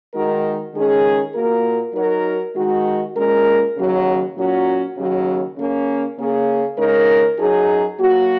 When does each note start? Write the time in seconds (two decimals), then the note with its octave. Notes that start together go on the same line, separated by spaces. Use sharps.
0.13 D#3 G#3 D#4 F#4 A#4
0.74 D#3 G#3 C#4 G#4
1.34 A#2 A#3 F#4 A#4
1.94 F#3 D#4 F#4 A#4
2.55 D#3 G#3 D#4 F#4
3.15 A#2 G#3 C#4 A#4
3.76 D#2 C#3 F#3
4.36 A#2 F#3 C#4 F#4
4.97 D#2 C#3 F#3
5.57 C#3 A#3 C#4
6.17 C#3 A#3 C#4 G#4
6.78 C#3 G#3 D#4 A#4
7.39 F#2 F#3 D#4 G#4
7.99 F#3 A#3 F#4